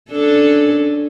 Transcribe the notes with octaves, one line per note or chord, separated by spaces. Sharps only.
C#4 D4 A4